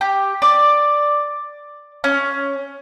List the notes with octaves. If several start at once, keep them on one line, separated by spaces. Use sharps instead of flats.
G4
D5
C#4